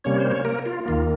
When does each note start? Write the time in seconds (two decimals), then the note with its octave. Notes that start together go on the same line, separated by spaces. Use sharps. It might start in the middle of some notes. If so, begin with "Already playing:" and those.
0.04 C3 G3 A#3 C#4 C#5
0.18 C5
0.31 C#4 C#5
0.45 A#3 A#4
0.66 F4
0.86 D#2 D#3 A#3 F4